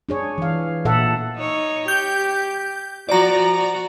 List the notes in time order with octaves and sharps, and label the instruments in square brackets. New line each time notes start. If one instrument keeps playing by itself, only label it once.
[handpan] D4 G#4 C#5
E3 F5
A#2 A4 E5 F#5
[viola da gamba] D#4 C#5
[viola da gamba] G4 [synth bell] G6
[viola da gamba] F3 F#4 [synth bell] D5 A#5
[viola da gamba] F#4